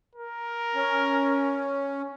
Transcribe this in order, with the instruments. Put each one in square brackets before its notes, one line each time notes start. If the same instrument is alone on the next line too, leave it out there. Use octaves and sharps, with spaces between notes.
[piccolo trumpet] A#4
[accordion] C#4